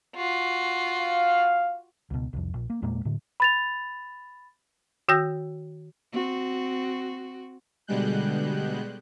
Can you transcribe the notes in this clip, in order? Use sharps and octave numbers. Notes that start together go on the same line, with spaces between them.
F4 F#4
F5
C#2 B2
C2 F2
A#1
A#3
E2 A#2 G#3 A#3
A2 D3
B5 A6 F7
D#3 F#4 G5 E6 G6 A#6
C4 F#4
B2 D3 G3 G#3 F#6 G6